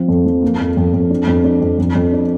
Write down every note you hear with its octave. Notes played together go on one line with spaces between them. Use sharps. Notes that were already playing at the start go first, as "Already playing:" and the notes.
Already playing: F3 C4
F2
F3
A#3
F2
F2
F2
D4
F2
D4
F2
F2
F2
D4